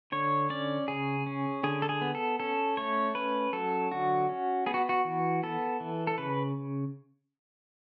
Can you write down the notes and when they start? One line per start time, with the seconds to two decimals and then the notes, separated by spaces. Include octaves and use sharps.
0.12 D3 C#5
0.50 C#4 D5
0.88 C#3 G#4
1.26 C#4
1.63 D3 G#4
1.82 A4
1.89 G#4
2.01 B3
2.15 A4
2.39 C#4 A4
2.77 A3 C#5
3.15 C#4 B4
3.53 F#3 A4
3.91 D3 F#4
4.29 C#4
4.66 B3 G#4
4.74 F#4
4.89 F#4
5.05 E3
5.43 B3 A4
5.80 E3
6.07 A4
6.18 C#3 B4